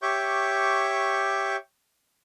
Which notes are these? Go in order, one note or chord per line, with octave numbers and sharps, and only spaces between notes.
G4 C#5 E5 C#6 D6 G6